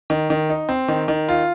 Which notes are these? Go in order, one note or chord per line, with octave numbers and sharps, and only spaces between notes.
D#3
D#3
D#4
C4
D#3
D#3
F4